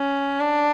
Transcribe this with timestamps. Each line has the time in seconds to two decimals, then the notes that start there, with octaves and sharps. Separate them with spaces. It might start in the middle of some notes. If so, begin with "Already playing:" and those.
Already playing: C#4
0.40 D4